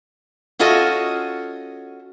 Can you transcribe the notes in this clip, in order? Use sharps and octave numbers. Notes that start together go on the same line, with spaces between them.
C#4 F4 F#4 A4 D#5